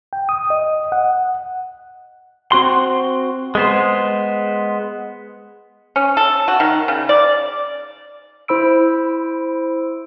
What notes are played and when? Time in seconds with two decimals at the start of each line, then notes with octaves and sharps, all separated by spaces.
0.13 G5
0.29 D#6
0.50 D#5
0.92 F#5
2.52 C4 F#4 C6
3.55 G#3 B3 C5
5.96 C#4
6.17 A4
6.48 F#4
6.60 D#3
6.88 C#3
7.09 D5
8.48 E4 C5 B5 E6 D7